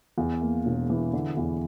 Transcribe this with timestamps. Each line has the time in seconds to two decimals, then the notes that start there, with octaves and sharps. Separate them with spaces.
0.18 E2
0.42 A#3
0.66 E1
0.90 E3
1.13 D3
1.37 E2